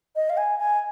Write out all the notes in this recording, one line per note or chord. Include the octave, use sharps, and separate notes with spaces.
D#5
F5
G#5
G#5